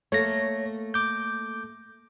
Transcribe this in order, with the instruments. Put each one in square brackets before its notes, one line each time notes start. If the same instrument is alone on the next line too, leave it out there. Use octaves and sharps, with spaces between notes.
[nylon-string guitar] A3 A#3 [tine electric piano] C#5 A#6
[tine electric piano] D6 G6